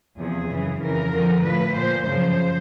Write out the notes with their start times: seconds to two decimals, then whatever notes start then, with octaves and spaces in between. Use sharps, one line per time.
0.18 E2 C3 F3 G#4
0.50 F#2 C#3 E3
0.81 F2 C#3 E3 A#4
1.12 F2 D3 F3
1.44 A2 F3 B4
1.75 A#2 F3 C5
2.07 F#2 C#3 F3 C5